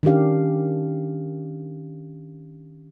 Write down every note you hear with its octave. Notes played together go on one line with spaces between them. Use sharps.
D#3 C#4 D4 G4 F5